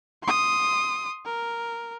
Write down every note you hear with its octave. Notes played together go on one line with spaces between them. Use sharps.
C6 D#6
A#4